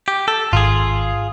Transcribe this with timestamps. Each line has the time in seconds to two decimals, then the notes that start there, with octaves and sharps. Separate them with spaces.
0.08 G4
0.28 A4
0.53 G#1 F4 G#4